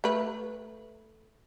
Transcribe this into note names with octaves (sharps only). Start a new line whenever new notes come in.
A3 B4